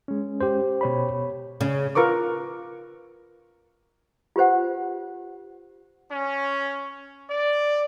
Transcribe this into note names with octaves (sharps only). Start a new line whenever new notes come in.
G#3 C#4
G4 C5
B2 C#5 B5
C#3
F4 A#4 B4 C#6 D6
F4 G4 B4 C5 F#5
C#4
D5